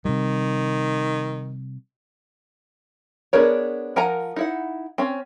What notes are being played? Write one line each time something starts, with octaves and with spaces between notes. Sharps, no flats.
C3 D#3 G3
B3 D4 G#4 A#4 C#5
F3 A#4 F#5 G#5 A#5
D#4 E4 F#5
C4 C#4